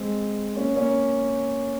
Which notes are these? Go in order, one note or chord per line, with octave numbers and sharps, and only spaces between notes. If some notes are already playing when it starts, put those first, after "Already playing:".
Already playing: G#3 C4
A#3 C#4
A#3 C#4